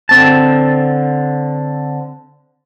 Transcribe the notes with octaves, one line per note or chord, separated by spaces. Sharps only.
D3 C4 A5